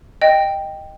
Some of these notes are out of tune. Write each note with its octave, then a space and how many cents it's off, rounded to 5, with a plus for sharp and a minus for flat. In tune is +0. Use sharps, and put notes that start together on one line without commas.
D#5 +0 G5 +0